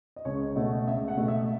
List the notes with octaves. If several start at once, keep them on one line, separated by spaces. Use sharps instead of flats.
D#5
C#2 C#5
B2 A3
C#2 E5
F#5
B2 A3
E5